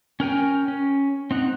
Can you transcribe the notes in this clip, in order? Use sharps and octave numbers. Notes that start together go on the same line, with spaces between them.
C#4 A#4 G5 G#5
C#4
C4 D#4 F#5